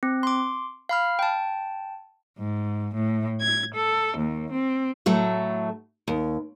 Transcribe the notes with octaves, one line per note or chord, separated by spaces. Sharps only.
C4
C6 D6
F5 B5 F6
G5 A5
G#2
A2
G#6
A4
D#2
C4
A2 F#3 A3
D#2